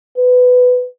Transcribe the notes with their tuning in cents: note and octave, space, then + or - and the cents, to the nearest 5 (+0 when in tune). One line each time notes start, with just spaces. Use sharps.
B4 +15